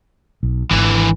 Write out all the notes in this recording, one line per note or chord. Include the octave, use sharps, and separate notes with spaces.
B1
G#1 D3 E3